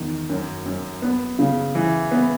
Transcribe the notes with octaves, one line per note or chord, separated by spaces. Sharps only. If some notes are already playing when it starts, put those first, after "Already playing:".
Already playing: E2 D#3
F#2
F#2
B3
C#3
E3
B3